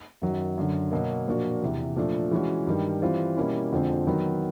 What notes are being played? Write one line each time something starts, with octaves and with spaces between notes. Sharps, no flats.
F#2 D#3 F#3
F#2 D3 F#3
B2 F#3 A#3
A#2 F3 A#3 D4 F#4
E2 C3 E3
A#2 F3 A3 D4
E3 G#3 C#4 F#4
G2 D#3 G3
E3 G3 C4 F4
B2 G3 A#3 C#4 E4
F2 D3 F3 G#3 C4
D#3 F#3 B3